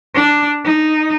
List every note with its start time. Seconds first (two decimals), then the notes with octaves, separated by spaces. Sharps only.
0.14 D4
0.64 D#4